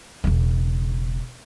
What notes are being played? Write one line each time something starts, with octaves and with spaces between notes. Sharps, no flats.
E1 C#3